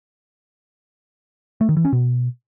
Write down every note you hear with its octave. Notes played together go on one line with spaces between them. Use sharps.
A3
D#3
E3
C#4
B2